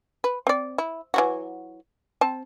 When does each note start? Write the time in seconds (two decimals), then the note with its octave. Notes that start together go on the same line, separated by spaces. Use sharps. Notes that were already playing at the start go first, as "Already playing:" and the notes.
0.24 B4
0.47 C4 D5
0.78 E4
1.14 E3 F#3 F#4
2.21 C4 A5